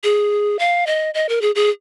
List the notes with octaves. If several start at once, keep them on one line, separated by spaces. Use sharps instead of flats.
G#4
F5
D#5
D#5
A#4
G#4
G#4